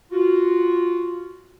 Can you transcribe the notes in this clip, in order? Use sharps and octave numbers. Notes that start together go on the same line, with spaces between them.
F4 F#4